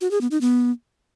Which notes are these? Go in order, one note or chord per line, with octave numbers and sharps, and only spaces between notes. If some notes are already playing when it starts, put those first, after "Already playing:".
F#4
G#4
B3
D#4
B3